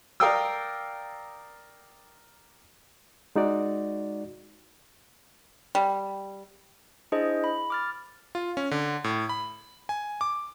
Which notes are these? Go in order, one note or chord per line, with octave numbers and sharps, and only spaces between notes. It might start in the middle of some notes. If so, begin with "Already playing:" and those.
A#4 D5 F5 G5 D#6 E6
G#3 D#4 F#4 D5
G3
D4 E4 G#4 C5 D#5
B5
D6 F6 A6
F4
C#4
D3
A2
B5
G#5
D6